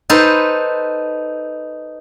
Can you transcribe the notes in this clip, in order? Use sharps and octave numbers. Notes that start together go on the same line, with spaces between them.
D#4 A4 B4 C5